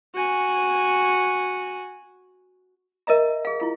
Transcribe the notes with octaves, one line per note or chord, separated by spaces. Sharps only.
F#4 G#5
A#4 D#5 E5 A#5
G#4 F5
E4 F4 F5